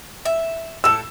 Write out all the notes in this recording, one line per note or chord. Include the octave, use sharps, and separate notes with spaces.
E5
A2 A4 E6 E7